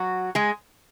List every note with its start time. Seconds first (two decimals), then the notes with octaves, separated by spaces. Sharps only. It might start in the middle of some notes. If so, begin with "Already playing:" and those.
Already playing: F#3 F#4
0.35 G#3 G#4